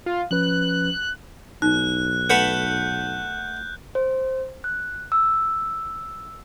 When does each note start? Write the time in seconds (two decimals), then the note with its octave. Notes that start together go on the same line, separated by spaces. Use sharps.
0.06 F4
0.31 F3 C#4 B4 F#6
1.62 B1 D#4 F#6
2.30 A3 B4 F#5 G6
3.95 C5
4.64 F#6
5.12 E6